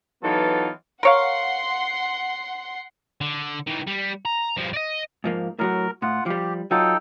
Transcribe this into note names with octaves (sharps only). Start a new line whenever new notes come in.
E3 F#3 B3 D#4 F4 A4
A#4 C#5 F5 F#5 C6
D3
D#3 E3
G3
A#5
G2 F3
D5 D#5
G#2 F3 A#3
A2 F#3 F#4 A#4
A2 F4 F#5
F3 G3 G4
F#3 D#4 F4 A4 G5